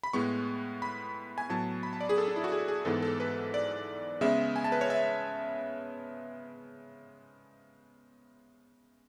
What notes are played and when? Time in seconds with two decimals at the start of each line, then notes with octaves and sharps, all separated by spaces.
0.03 B5
0.13 A2 G#3 B3 C#6
0.82 B5
1.38 G#5
1.49 A2 F#3 B3 A5
1.83 B5
1.93 A5
2.01 D5
2.09 G#4
2.18 A4
2.28 D4
2.36 E4
2.44 F#4
2.52 G#4
2.68 G#4
2.85 G#2 E3 G#3 B3 A4
3.02 A4
3.20 B4
3.54 D5
4.21 C#3 G#3 B3 E5
4.56 G#5
4.64 A5
4.72 B4
4.81 C#5
4.90 E5